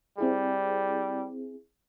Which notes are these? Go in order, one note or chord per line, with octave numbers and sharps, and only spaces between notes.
G3 C4 E4 G#4